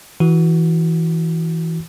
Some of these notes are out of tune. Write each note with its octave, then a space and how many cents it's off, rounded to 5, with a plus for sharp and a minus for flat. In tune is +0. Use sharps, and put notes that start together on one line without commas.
E3 -15 F#4 +0